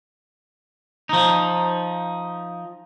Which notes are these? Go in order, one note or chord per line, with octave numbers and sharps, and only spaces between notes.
F3 D#4